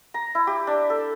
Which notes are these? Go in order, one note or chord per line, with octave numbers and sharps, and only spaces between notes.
A#5
E4
G4
D4
A4